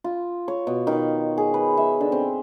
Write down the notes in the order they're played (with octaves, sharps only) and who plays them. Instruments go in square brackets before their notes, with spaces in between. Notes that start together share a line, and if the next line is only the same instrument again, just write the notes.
[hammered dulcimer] F4
C#5
B2
D#3
G#4
B4
E5
D3
C4